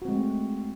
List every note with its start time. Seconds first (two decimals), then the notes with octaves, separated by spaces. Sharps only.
0.02 F#4
0.05 C4
0.09 G#3
0.12 A3